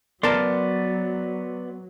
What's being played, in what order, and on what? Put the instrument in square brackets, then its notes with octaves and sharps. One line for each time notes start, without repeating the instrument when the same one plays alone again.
[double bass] F#3 [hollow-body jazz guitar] B3 A#4 A5 [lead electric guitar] D5 C6